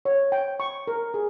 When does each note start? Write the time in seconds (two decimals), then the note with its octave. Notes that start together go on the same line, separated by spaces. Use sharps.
0.05 C#5
0.32 G5
0.60 C#6
0.87 A#4
1.14 G#4